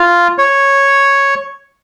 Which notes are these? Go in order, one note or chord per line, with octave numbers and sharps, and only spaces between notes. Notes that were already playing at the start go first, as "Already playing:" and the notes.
Already playing: F4
C#5